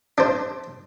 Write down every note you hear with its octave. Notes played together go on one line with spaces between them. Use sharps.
D4 C5